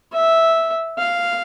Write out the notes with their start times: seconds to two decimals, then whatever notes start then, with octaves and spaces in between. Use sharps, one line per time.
0.13 E5
0.98 F5